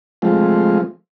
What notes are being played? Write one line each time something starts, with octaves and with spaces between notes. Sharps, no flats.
F3 G#3 A3 C4 F4